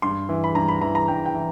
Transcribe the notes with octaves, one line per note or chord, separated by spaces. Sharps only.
G2 C6
E3
B5
G2 A#5
B5
E3 A#5
A#5
G2 G5
G5
E3